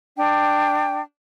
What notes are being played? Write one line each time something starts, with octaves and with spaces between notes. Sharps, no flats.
D4 G5